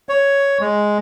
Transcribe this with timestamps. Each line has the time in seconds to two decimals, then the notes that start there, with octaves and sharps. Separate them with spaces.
0.09 C#5
0.61 G#3